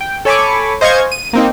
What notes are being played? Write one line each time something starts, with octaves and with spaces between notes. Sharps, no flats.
G5
A4 C#5 G#5 B5 C#6 D6
C5 D#5 F5 G#5 C#6 G#6
D#7
A#3 C4 D#4